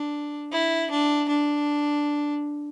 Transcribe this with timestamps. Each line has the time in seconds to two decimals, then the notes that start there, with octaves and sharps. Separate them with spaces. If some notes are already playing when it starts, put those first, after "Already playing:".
Already playing: D4
0.52 E4
0.91 D4
1.28 D4